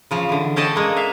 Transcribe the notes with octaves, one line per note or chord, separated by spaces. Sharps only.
C#3 F3
D3 E3
C#4 G4 A4 D5 D#5 A5
G#3 A#3
E5 F5